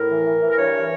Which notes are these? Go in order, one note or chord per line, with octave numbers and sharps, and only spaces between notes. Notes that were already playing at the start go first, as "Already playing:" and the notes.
Already playing: A2 A#4
E3
E3
E3
A#4
G2 C#5
E3